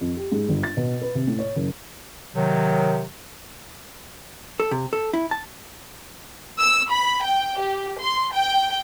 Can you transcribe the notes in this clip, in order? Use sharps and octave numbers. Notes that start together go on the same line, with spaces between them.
F2
G4
G#2
G1
A6
B2
B4
C3
A2
C#5
F#1
C3 D#3 F#3
A4
C3
A4
E4
A5
E6
B5
G5
G4
C6
G5